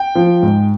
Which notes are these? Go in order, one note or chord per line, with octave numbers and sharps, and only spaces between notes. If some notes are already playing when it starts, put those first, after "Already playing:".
Already playing: G5
F3
G#2